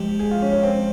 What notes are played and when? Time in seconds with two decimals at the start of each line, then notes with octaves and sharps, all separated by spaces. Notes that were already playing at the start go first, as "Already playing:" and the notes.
Already playing: F3 G#3 G4
0.19 G#4
0.31 F4
0.42 C#4
0.52 C#4
0.63 C4